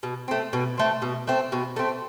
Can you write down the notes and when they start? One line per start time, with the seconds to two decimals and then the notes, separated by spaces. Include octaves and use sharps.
0.03 B2
0.28 A3 C4
0.53 B2
0.77 A3 C4
1.02 B2
1.27 A3 C4
1.52 B2
1.76 A3 C4